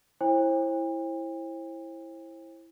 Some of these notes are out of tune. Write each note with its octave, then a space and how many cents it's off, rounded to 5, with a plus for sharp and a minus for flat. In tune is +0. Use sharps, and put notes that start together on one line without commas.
E4 +0 C5 +35 G5 +45